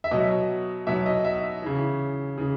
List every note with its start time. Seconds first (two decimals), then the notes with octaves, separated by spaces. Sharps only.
0.04 E5
0.11 B2 F#3 D#5
0.87 B2 F#3 E5
1.06 D#5
1.25 E5
1.62 C#3 E3
2.38 C#3 E3